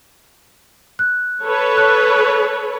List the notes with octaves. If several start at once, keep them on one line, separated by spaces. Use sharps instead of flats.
F#6
A4 B4 C#5
F#6